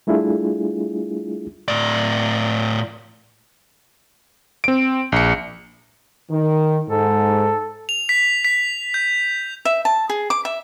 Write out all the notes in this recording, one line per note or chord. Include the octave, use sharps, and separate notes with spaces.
G3 A3 D4 E4 F4 G#4
A2 D5
C4 D7
A#1 C#7
D#3
G#2 A4
F7
B6
B6
G6
E5
A5
G#4
D6
E5